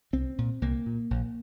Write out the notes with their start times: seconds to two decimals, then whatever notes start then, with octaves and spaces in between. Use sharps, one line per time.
0.13 C2 C4
0.38 A#2
0.62 C2 A#3
0.86 A#2
1.11 A#1